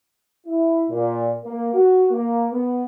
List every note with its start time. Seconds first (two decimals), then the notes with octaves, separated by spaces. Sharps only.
0.47 E4
0.90 A#2
1.45 A#3
1.74 F#4
2.11 A#3
2.51 B3